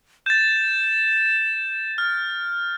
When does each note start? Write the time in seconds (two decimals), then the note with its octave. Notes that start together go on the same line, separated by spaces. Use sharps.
0.26 G6 A6 E7
1.98 F6